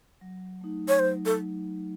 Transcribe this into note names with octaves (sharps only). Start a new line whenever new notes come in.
F#3
A3 D#4
C#5
F#3 C5
A4